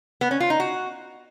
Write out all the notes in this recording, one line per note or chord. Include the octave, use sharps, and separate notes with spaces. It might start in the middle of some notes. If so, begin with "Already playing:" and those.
B3
C#4
F4
D#4
F#4